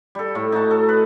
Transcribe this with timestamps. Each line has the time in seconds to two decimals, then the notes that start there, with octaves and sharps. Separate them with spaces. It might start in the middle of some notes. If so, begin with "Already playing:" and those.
0.15 G3 A4
0.35 A2
0.52 D#4 F#4 A5
0.71 A4
0.89 B4